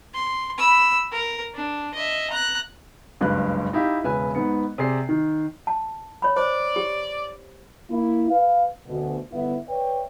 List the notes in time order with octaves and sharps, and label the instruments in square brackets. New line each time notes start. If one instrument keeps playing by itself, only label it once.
[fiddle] C6
B5 E6
A#4
D4
D#5 E5
A#5 F#6
[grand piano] F#1 C#2 G2 B4 F#6
D#4 E4 G4 F5
E1 C#3 B4 E5 G#5 F#6
G#2 B3 C#7
C3 G#4 D5 C6 C7
D#3
[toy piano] A5
C#5 B5
[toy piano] C5 [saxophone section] D5
[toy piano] G4
[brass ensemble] A#3 E4
B4 F5
D2 B2
G1 D3 B3 E4 E5
B4 C#5 D5 E5 G5